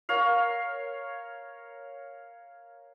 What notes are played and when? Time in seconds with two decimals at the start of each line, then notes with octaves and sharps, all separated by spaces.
0.09 A#4 C#5 F5